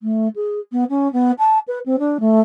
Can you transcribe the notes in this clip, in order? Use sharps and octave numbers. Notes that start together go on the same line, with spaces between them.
A3
G#4
B3
C#4
B3
A5
B4
C4
D4
A3